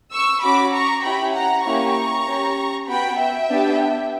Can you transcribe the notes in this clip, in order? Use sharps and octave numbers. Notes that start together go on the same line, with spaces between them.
C#6 E6
C#4 F#4 B5 D6
A#5 C#6
C#4 E4 G4 G5 B5
F#5 A#5
A#3 C#4 E4 G4 A#5 C#6
C#4 G4
B3 F#4 G5 B5
E5 G5
B3 D4 G4